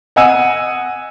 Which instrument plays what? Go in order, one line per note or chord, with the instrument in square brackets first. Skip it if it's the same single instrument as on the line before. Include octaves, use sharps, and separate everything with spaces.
[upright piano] D#5 F#5 G#5 E6 D#7